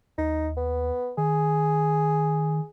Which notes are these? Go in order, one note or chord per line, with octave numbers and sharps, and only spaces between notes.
D#2 D#4
B3
D#3 G#4